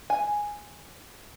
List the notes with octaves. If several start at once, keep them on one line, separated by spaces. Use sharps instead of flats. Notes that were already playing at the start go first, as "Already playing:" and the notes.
G#5